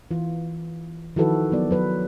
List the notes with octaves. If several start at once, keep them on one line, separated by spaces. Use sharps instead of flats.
E3 F4
D#3 F3 E4 F#4 A4 B4
F#3 B3 D5
F#3 B4